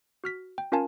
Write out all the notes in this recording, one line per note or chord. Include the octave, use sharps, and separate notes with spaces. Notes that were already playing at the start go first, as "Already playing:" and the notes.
F#4 F6 B6
G5
C#4 F4 A#4 F5 G#5 A5